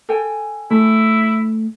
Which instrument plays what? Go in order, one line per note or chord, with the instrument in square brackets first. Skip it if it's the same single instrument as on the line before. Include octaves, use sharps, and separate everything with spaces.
[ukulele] A4 G5 G#5
[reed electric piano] A3 [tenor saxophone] E4